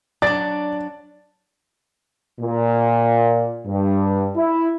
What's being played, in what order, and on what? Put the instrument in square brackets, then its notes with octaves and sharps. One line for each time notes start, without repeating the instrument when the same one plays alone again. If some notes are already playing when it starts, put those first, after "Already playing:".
[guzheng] F#3 D4 [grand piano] D5 [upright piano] A6
[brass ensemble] A#2
G2
E4